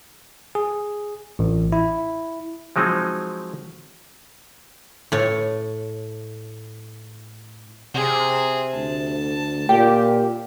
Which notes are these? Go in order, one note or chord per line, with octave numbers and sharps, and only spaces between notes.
G#4
A1
E4
F3 F#3 G#3 C4 D#4
A2 C#5
C3 C4 G#4
D2 A5
A#2 G4 G5